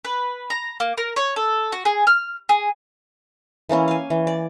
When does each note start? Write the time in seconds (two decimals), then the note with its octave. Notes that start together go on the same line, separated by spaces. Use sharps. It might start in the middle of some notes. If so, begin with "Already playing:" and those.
0.05 B4
0.50 A#5
0.80 A#3
0.98 A#4
1.16 C#5
1.36 A4
1.72 F#4
1.85 G#4
2.07 F6
2.49 G#4
3.69 E3 A#3 C#4 E4
3.88 F5 G#5
4.10 E3
4.27 D5